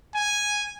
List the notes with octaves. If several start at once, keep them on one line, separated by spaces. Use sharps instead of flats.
G#5